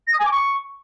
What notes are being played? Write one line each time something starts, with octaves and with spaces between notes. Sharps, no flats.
A#6
D#6
G#5
D6
C#6